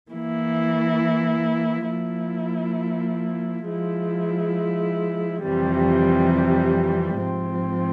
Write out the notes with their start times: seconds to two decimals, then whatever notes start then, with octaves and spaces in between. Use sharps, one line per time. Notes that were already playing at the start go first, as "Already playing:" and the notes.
0.11 E3 A#3 E4
1.89 F3 A#3 E4
3.66 F3 G#3 E4
5.43 F2 C3 E3 G3
7.21 G#2 F3 C4